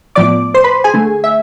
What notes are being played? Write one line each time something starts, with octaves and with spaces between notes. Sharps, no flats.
A2 F3 B3 D5 D6
C5 C6
B4 B5
G#4 G#5
D3 A3
E5